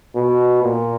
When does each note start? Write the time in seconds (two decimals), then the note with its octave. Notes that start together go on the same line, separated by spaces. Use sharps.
0.16 B2
0.63 A#2